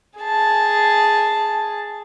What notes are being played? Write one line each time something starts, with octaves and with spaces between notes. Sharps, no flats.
G#4 A5